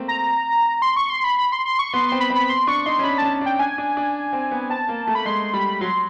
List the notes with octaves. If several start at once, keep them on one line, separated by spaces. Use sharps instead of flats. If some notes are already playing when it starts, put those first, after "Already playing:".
Already playing: A3 A#3 C4
A#5
C6
C#6
C6
B5
B5
C6
C6
C#6
B3 C6
C4 C6
B5
C4
B5
C6
D4 C#6
D#4 C6
C#4
D4 B5
C#4 A5
D4
G5
D4 G#5
D4
D4
C4
B3
C4 A5
A#3
A3
B5
G#3 C6
G3 B5
F#3 C6